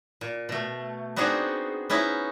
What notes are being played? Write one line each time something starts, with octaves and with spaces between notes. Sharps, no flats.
A#2
B2 A3
B3 C4 D4 D#4 F#4 G#4
B3 C#4 D#4 E4